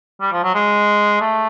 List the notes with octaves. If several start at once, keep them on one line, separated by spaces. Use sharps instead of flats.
G3
F3
F#3
G#3
A3